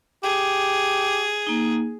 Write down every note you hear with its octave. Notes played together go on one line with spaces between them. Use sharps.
G4 G#4
A#3 D#4